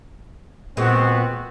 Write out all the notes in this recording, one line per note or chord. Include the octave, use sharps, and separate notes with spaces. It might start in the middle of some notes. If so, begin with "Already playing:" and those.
A#2 G#3 B3 C4 F#4